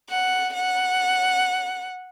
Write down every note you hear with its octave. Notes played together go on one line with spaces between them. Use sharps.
F#5
F#5